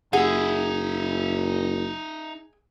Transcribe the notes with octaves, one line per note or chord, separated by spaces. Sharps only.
F#1 D#4 G#4 E5 F#5